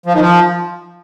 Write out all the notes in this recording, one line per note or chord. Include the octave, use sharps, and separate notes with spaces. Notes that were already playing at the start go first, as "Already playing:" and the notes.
F3
D#3
F3